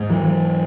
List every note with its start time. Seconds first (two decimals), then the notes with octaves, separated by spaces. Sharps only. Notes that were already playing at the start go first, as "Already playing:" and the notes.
Already playing: G#2
0.09 E3 F#3
0.24 E3 F#3